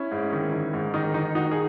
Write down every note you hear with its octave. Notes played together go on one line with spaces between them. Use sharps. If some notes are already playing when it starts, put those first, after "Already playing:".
Already playing: C#4 E4
G#2
D#3
D#3
G#2
D#3 D#4
D#3 D#4
D#3 D#4 F#4
G#4